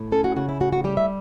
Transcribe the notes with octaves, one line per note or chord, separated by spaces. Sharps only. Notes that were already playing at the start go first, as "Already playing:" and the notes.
Already playing: A2
C#4 A4
F#4
C#3 F#4
E4
A2 F#4
F#4
G3 G4
E5